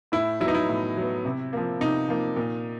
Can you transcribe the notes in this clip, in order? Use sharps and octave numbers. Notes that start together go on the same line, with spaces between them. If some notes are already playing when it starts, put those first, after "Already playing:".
A2 E4
F#3 B3 D#4 E4
E4
A2
F#3 B3
C3
F3 A#3
C3 D#4
F3 A#3
A#2